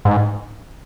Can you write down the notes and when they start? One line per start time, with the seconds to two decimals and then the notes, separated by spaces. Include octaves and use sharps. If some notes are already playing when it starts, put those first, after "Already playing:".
0.05 G#2